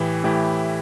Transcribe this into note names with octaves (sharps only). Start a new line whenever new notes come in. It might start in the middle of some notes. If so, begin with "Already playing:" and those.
Already playing: A2 E3 A3 E4 G4
A2 E3 A3 E4 G4